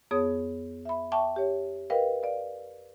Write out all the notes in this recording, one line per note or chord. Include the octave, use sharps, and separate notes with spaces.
F2 B3 G#4 C#5 D#6
E5 B5
E5 G5 A5 C#6 D6
G4 C#5
A#4 B4 D#5 F5 G5
D5 F5